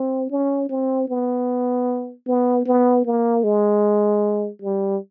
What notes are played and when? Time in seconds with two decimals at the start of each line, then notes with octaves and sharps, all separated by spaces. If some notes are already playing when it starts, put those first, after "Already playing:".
Already playing: C4
0.30 C#4
0.69 C4
1.09 B3
2.27 B3
2.66 B3
3.06 A#3
3.44 G#3
4.62 G3